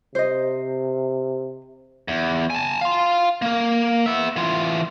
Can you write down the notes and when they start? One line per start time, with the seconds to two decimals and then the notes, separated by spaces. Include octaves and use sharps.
0.15 C3 C5 D#5
2.08 E2
2.50 G#5 A5
2.81 F5 C6
3.42 A#3 A#4
4.06 B3 E5
4.36 E3 F4